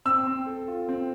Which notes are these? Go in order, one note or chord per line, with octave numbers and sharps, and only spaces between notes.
C4 E6
C4
A4
F4
C4